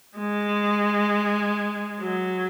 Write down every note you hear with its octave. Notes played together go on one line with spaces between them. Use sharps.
G#3
F#3